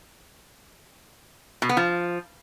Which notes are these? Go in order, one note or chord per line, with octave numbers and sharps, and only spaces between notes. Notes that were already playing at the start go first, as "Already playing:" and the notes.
B2
B3
F3